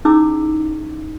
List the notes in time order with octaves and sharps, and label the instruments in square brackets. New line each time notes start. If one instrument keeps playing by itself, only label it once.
[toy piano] C#4 D#4 E4 G#4 D6 E6